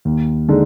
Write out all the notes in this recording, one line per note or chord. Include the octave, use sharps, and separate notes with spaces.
D#2
D3 G#3 D#4